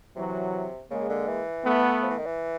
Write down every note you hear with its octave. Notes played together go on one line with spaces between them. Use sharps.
C3 E3 F#3
C#3 G#3 A#3
D3
E3
A3 B3
F3
E3
D#3
E3